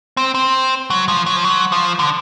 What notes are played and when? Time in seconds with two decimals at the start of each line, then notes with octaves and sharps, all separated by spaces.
0.17 C4
0.35 C4
0.90 F#3
1.08 F3
1.26 F#3
1.36 F3
1.44 F#3
1.72 F3
1.99 D3